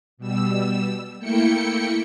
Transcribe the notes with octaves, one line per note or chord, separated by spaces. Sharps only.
B2 G3 E6
A3 A#3 E4 G5 C#7